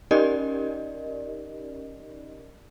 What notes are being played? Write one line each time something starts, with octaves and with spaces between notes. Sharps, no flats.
C#4 D#4 G4 A#4 D5 D#5